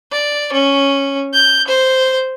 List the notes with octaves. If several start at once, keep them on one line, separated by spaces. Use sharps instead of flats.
D5
C#4
G6
C5